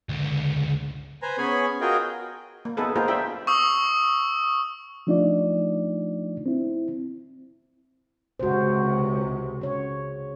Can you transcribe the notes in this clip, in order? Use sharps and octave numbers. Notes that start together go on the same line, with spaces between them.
C#2 D3
B4 C5 G#5 A#5
B3 C#4 G#4 C#5 G#5 B5
F4 F#4 G#4 A#4 D#5 G5
A#3
B3 D#4 G#4 A4 B4
A#3 D#4 F4 G#4 A#4 C5
D4 F4 E5 G5 B5
C#6 D#6 E6
F3 A3 D4 D#4 F4 D5
C4 E4
C#2 C3 F#4 C5
C#3 C#5